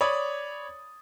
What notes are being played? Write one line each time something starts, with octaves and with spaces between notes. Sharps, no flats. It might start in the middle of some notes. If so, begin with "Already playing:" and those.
C#5 D5 B5 D#6